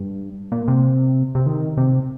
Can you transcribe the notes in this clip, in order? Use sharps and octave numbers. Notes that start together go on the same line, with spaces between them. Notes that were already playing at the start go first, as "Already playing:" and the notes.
Already playing: G2
A#2
C3
C3
D#3
C3